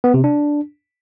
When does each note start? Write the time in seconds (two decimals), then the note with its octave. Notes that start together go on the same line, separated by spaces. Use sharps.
0.04 B3
0.14 C3
0.24 D4